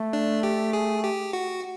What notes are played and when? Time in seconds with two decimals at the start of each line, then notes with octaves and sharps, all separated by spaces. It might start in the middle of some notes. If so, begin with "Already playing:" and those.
Already playing: A3
0.13 D4
0.43 G4
0.73 G#4
1.04 G4
1.33 F#4